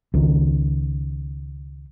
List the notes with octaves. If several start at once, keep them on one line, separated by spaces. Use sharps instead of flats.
C#2 D#3